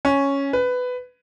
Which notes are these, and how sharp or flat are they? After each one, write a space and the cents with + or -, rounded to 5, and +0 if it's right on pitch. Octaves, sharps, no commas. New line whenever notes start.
C#4 +0
B4 +15